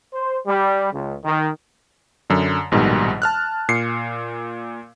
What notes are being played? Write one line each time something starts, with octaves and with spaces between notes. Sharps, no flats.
C5
G3
C#2
D#3
F#2 D3
A#1 G#2 B2 D#3 G3
A5 F6 F#6
A#2 C7 C#7